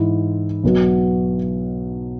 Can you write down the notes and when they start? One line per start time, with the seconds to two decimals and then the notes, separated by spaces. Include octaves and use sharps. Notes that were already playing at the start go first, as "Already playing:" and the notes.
Already playing: G#2 E3 G#3 E4
0.63 B1 B2 F#3 B3 F#4